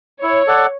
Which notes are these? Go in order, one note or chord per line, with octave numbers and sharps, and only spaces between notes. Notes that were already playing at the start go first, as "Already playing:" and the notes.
E4 C#5
A4 D5 F#5